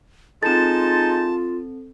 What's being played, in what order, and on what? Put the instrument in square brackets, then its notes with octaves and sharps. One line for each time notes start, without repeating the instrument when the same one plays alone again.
[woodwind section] G#3 D#4 A5 [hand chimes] C4 A4 [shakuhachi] F4 [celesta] A6 E7